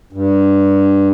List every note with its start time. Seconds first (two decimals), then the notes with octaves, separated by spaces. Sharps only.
0.13 G2